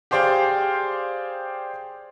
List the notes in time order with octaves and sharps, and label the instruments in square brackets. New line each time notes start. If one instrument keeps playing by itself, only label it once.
[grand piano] G4 G#4 C5 D5 F5 G5